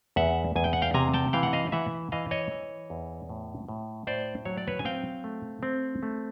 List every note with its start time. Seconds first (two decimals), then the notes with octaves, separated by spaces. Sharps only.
0.16 E2 E5 F#5
0.56 E2 G#5
0.64 G5
0.73 F#5
0.82 F5 G5
0.94 C3 G#5 A#5
1.14 G5 A5
1.33 E3 F5 G5
1.43 F#5
1.53 D#5 F5
1.72 E3 E5 F#5
2.12 E3 D#5 F5
2.31 C#5 D#5
2.51 E3
2.90 E2
3.29 A2
3.69 A2
4.07 A2 C5 D5
4.45 F#3 C#5
4.58 D5
4.68 B4 C#5
4.79 G#5
4.85 C4 F5 G5
5.24 A3
5.63 C4
6.03 A3